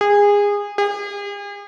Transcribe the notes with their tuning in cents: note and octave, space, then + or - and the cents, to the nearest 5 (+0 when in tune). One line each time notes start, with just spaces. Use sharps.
G#4 -25
G#4 -45